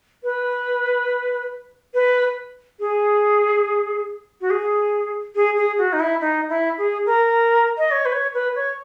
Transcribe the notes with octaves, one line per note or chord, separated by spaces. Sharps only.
B4
B4
G#4
F#4
G#4
G#4
G#4
F#4
D#4
E4
D#4
E4
G#4
A#4
D#5
C#5
B4
C#5
B4
C#5